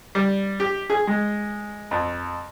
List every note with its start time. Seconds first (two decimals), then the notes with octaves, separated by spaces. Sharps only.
0.15 G3
0.60 G4
0.90 G#4
1.07 G#3
1.91 F2